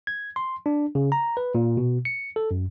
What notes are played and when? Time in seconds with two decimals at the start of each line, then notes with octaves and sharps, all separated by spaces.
0.07 G#6
0.36 C6
0.66 D4
0.95 C#3
1.12 A#5
1.37 B4
1.55 A#2
1.77 B2
2.05 C#7
2.36 A4
2.51 F#2